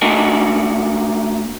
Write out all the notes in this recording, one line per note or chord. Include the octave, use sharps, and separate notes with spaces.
A3 A#3 D4 F#4 D#5 G#5